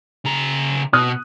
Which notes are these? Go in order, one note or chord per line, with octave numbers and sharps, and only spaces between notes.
C#3 A#5
B2 D#6 F#6